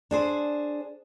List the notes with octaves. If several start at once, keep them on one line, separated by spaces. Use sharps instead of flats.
D4 G#4 C5